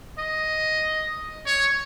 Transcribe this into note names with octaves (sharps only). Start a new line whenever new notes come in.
D#5
C#5